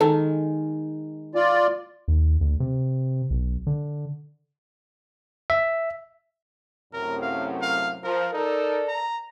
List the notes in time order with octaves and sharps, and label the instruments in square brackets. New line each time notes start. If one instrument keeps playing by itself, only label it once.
[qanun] D#3 G#3 [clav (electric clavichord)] A4
[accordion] F4 D5
[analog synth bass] D#2
D2
C3
B1
D3
[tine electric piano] E5
[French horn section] F#2 A2 C3 [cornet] A#4
[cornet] F5
F5
[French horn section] F3 [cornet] A#4
[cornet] D#4 [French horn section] A4 A#4 D5
[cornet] A#5